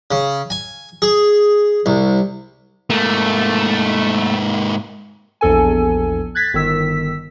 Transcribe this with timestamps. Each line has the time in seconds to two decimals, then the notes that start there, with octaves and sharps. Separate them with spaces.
0.11 C#3
0.50 G#5
1.02 G#4
1.86 C2
2.90 G#2 A3 A#3
5.41 A#1 E2 A4 G#5
6.35 F#6 G#6 A6 B6
6.54 G1 D#3 E6 B6